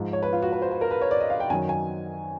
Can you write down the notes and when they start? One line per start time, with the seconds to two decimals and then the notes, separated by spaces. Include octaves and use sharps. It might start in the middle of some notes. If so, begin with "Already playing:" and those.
Already playing: G#2 F3
0.13 C#5
0.23 B4
0.33 F4
0.42 F#4
0.52 B4
0.62 C5
0.71 B4
0.81 A#4
0.91 B4
1.02 C#5
1.11 D5
1.20 D#5
1.30 F5
1.40 G5
1.50 F#2 D#3 F#3 G#5
1.69 G#5